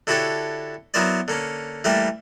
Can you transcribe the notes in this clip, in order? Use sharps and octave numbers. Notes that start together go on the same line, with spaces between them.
D3 E4 F#4 G4 A4 C#5
F#3 B3 E4 A#4 C5 D5
D3 A#3 C#4
E3 G3 A3 A#3 G4 E5